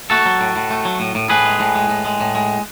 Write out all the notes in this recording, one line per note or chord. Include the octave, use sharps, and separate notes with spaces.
A3 F#4 A4
F#3
A2
A2
A3
F#3
A2
A2
A2 G#4 B4
G#3
A2
G#3
A2
G#3
A2
G#3